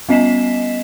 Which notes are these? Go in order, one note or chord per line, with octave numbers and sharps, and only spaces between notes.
G3 B3 D#5 B6 C7 E7